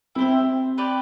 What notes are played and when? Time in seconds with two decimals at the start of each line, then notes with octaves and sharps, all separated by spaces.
0.15 C4 E4 G4 C5
0.78 G4 B4 D5